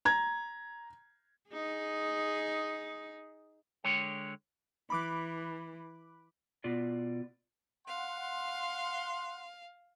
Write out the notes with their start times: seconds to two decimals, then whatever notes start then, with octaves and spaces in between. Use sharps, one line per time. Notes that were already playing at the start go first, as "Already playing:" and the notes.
0.05 A#5 G#6
1.50 D#4 G#4
3.84 D3 G#3 C#5 G5
4.90 E3 B5 D6 F#6
6.64 B2 F4 D5
7.86 F5 F#5 C6